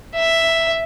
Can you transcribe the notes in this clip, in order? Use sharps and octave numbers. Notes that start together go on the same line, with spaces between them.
E5